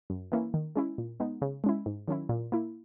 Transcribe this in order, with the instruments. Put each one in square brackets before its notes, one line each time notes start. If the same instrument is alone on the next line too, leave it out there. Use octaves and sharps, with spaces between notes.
[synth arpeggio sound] F#2
E3 A#3 C#4 E4
D#3
G#3 C#4 E4
A#2
G#3 B3 D#4
C#3
G#3 C#4 E4
G#2
D#3 F#3 C#4 E4
A#2
A#3 E4